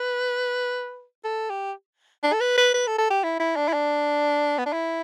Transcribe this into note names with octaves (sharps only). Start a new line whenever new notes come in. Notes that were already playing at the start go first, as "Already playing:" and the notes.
Already playing: B4
A4
G4
D4
A4
B4
B4
B4
A4
A4
G4
E4
E4
D4
E4
D4
B3
D4
E4